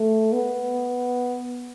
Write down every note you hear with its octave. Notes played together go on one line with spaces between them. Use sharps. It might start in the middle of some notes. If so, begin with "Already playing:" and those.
Already playing: A3
B3